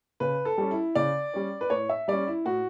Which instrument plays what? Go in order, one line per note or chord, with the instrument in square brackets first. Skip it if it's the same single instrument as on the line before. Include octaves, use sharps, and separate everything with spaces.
[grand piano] C#3 B4
A4
G3 C#4
E4
C#3 D5
G3 C#4
B4
A2 C#5
E5
G3 C#4 D5
E4
A2 F#4